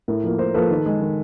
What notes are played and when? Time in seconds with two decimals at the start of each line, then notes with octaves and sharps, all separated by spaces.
0.08 A2 A#4
0.24 F3 A#3
0.38 A2 A#4 C5
0.54 F3 A#3 A4 B4
0.70 D#3
0.86 G#3
1.01 D#3